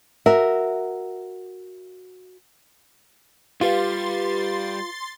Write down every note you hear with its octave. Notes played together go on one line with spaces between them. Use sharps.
F#4 A#4 E5
G3 F4 G4 B4 F5 C6 A6